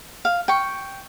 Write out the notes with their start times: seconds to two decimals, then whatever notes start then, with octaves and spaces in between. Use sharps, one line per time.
0.25 F5
0.48 G5 C#6